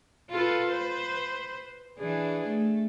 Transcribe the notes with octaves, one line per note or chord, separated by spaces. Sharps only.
F4 A4 B4
B4 C5
E3 D4 G#4
A3